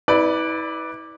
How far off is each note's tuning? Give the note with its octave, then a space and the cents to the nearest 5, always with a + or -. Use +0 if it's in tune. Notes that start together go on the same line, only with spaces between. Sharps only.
E4 -35 B4 +0 D5 +0